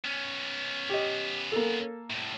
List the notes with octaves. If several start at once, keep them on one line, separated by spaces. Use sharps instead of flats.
B3 C#4
G4 D#5
A#3 A4
C2 A2